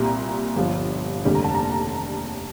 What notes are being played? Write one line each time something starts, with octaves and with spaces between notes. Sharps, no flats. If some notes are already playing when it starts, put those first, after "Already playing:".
Already playing: C2 A#2 G3 A#5
G1 G2 F3
F1 D#2 D3 G3
A#5
A5
A#5